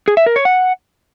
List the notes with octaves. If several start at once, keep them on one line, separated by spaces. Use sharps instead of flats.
G#4
E5
A#4
C#5
F#5